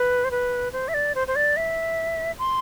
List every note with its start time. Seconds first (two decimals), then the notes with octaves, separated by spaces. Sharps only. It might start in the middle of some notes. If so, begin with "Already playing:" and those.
Already playing: B4
0.24 C5
0.31 B4
0.73 C5
0.88 E5
0.94 D5
1.15 C5
1.27 C5
1.36 D5
1.57 E5
2.39 C6